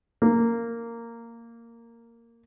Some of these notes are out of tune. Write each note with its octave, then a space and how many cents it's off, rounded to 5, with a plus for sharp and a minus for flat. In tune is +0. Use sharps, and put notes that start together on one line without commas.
A#3 -10